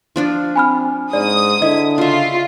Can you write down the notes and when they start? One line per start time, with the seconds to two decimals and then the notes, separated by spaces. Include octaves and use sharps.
0.16 F3 D4 F4
0.56 C4 G#5 B5 F6
1.13 G#2 D5 D#6
1.62 D3 E4 D#5
1.98 C#3 F4 E5